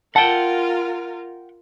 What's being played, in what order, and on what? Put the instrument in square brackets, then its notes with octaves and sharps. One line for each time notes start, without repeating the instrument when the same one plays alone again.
[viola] F4 A#4 [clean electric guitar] F#5 G5 [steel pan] A5